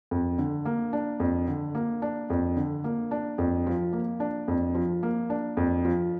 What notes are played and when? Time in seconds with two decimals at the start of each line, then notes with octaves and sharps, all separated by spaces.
0.11 F2
0.38 D3
0.65 A#3
0.93 D4
1.20 F2
1.48 D3
1.75 A#3
2.02 D4
2.30 F2
2.57 D3
2.84 A#3
3.11 D4
3.38 F2
3.67 F3
3.93 A#3
4.20 D4
4.48 F2
4.75 F3
5.03 A#3
5.30 D4
5.57 F2
5.85 F3